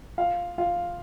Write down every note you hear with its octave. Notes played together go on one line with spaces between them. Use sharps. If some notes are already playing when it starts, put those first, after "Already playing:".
F4 F5
F4 F5